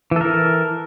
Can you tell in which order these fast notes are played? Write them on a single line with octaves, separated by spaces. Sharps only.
E3 A4 A#4